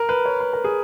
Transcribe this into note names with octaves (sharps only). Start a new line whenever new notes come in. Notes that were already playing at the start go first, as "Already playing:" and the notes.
Already playing: A#4
B4
C#5
B4
A#4
G#4